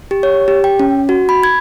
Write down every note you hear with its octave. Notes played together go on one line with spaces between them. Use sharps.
G4
C#5
G4
G5
C#4
F#4
B5
G#6